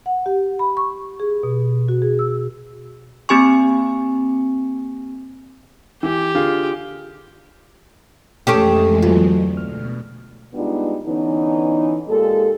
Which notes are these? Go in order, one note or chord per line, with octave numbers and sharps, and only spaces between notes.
F#5
G4
B5
C#6
G#4
B2
F#4
G#4
E6
A#3 C4 G4 G#5 C#6
E3 G4
D3 F4 G#4
F2 E3 G#3 A3 C#4 G4 D#6 C7
D2 F#3 A#3 F4
B2 F6
G3 G#3 B3 D4 D#4 F4
D3 E3 B3 C#4 D#4
A#2 G#3 A#3 G4 A4